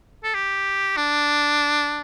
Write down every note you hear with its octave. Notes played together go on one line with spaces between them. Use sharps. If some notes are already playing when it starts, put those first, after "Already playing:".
A4
G4
D4